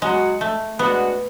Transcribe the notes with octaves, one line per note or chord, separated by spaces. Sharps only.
F#3 G#3 B3 F#4
A3
G#3 B3 D4 F#4